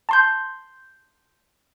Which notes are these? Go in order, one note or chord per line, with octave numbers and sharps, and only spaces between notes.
A5 C6 G6